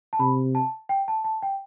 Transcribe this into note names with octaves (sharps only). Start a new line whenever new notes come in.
A5
C3 B5
A5
G5
A5
A5
G5